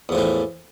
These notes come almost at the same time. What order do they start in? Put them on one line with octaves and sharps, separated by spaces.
E2 F3 A2 E3